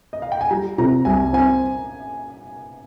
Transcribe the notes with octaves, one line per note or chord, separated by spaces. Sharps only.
D#5
F5
G5
G#5
G3 A#5
C3 A#5
C2 G#5
C4 G#5